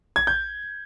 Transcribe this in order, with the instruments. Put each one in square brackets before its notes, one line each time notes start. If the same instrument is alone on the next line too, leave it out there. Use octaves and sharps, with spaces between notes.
[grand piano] G#6
G6